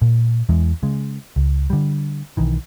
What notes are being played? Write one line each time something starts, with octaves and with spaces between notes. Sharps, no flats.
A#2
E2 E3 G#3
C#3 G#3
C#2
D3 G3
B1 D#3 E3